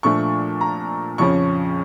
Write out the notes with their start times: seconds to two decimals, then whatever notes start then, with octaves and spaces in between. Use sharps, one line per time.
0.03 A#2 F3 A3 D4 C#6
0.61 A#5
1.18 F2 C#3 F3 C#4 C#6